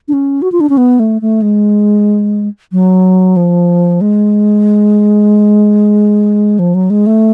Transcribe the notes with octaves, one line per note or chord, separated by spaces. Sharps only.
D4
C#4
F#4
F4
D4
C#4
B3
A3
A3
G#3
F#3
F3
G#3
F3
F#3
G#3
A3